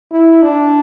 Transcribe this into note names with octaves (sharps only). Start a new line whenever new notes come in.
E4
D4